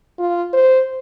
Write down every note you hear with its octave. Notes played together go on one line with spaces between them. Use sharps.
F4
C5